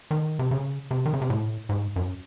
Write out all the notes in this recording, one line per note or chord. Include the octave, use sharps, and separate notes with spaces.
D#3
C3
C#3
C3
D#3
C#3
C3
A2
G#2
F#2